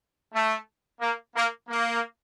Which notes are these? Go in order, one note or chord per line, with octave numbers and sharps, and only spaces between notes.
A3
A#3
A#3
A#3